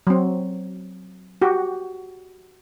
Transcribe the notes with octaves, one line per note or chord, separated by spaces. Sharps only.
F#3 C4
F#4 G4